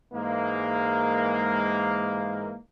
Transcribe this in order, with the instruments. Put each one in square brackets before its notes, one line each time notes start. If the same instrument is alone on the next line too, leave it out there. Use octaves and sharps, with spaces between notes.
[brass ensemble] G#2 E3 G#3 A#3